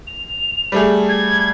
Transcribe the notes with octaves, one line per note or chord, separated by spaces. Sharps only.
F7
G3 A3 G#4
G#6